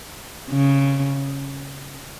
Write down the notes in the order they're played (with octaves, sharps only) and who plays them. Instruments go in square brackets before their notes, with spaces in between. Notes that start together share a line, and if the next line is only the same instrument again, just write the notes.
[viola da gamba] C#3